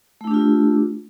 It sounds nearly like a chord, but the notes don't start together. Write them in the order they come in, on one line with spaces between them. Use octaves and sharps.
A3 E4 D4 G4 F4